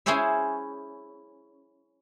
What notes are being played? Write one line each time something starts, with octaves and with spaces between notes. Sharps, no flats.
C#4 E4 G#4 C5 C#5 E5